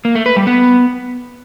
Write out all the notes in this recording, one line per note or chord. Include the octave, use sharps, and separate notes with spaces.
A#3
A3
B4
G3
B3